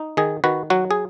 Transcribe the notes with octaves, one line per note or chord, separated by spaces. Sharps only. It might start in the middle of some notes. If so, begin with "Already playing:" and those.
Already playing: D#4
D#3 G#4
D#3 F#4 B4
F#3 F#4
G#4